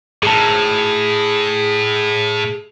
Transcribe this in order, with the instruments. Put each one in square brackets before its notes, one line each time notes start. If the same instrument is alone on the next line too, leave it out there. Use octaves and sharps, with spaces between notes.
[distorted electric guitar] A2 [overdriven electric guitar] G#4 A5